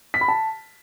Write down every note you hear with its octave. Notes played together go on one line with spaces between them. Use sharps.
B6
B5
A5